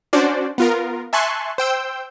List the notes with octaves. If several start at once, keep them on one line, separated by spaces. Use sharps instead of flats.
C#4 D4 F#4 C5 D5
B3 F4 A#4
E5 G#5 A5 C6 C#6 F#6
C5 G5 E6 G6